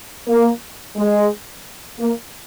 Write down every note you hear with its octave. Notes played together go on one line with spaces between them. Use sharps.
A#3
G#3
A#3